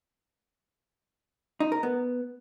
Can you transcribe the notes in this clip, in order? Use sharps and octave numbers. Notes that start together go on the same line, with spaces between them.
D#4
A#4
B3